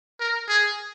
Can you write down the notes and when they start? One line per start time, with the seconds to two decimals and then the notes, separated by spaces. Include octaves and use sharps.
0.20 A#4
0.49 G#4